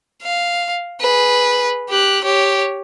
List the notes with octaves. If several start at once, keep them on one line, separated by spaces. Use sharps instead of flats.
F5
G#4 B4
G4 F#6
G4 C#5